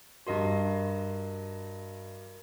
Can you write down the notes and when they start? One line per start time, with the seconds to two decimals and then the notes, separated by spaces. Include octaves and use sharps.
0.27 G2 F#4 A#4 D#5 C6